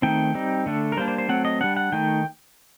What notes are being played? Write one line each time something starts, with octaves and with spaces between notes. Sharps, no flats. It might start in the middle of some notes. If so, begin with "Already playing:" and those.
D#3 A3 C4 D#4 G5
G3 C4 D#4
D3 A3 D4
A#4
G3 A#3 D4 C5
C5
C5
F#3 A3 C4 F#5
D#5
G3 D4 F#5
F#5
D#3 A3 D#4 G5